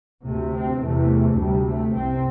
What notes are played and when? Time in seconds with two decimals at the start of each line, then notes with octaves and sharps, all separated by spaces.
0.25 D2 C3 A3
0.53 C4
0.81 E2 C3 A3
1.37 D2 C3 G3
1.66 A3
1.93 C2 C3 C4